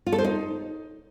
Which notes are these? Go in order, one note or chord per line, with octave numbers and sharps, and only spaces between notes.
F4
A4
C5
D#4